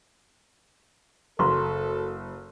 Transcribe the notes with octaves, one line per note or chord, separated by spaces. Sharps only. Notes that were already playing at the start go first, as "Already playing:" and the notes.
F#1 F#4 A4 A#5 C6 C#6